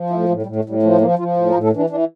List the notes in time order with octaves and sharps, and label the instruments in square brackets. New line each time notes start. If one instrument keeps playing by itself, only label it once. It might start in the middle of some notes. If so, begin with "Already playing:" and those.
Already playing: [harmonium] F3
A2 E4
A2 A3
G3
A2
A3
A2 G3
F3 A3
F3 A#3
F3 F4
A2
A#4
A2
A4
E3 D4
E3 D4